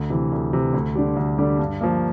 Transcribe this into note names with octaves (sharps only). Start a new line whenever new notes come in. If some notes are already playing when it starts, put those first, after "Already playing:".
Already playing: D2
C3 E3
D2
C3 E3
D2
D3 G3 D4 G4
D2
D3 G3 D4 G4
G2
F3 A#3